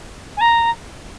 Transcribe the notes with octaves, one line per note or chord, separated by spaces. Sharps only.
G#5
A#5